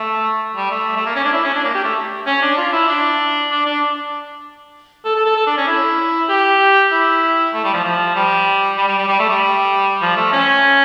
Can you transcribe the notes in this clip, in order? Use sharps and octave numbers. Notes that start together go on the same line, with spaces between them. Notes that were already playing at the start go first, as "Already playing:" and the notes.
Already playing: A3
G3
A3
A3
A#3
C#4
D4
E4
C#4
D4
A#3
G4
A3
C#4
D4
F4
E4
D4
D4
D4
A4
A4
A4
A4
D4
C#4
E4
G4
E4
A3
G3
F3
F3
G3
G3
G3
G3
G3
A3
G3
F3
A3
C#4